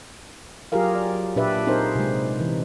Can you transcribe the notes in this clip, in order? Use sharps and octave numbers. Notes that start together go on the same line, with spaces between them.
F#3 F4 G4 G#4 A#4 F5
D5
A#2 D4 G4 B4 D5 E5
C4 D#4 G#4 A#4 C5
C3 G#3
E3